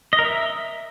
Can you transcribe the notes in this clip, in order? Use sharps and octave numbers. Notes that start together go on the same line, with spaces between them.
D#5
A#4
E5